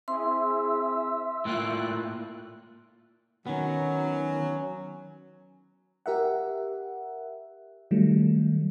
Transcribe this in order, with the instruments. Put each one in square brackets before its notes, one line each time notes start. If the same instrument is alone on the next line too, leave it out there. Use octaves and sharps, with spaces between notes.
[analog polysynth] C4 E4 G#4 [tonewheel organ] E5 [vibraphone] C6
[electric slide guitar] A2 A#3 F4 [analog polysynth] G5 F#6
[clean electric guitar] D#3 B3 [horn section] F#3 [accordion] C#4
[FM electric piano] G4 A#4 E5 F#5
D#3 F#3 G3 A3